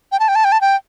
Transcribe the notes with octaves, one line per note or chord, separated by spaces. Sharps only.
G5
A5
G5
A5
G5
A5
G5